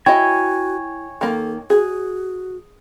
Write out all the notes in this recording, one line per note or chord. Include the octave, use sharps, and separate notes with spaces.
E4 F#4 C#5 D#5 G5 G#5
D#3 A#3 A4
F#4 G#4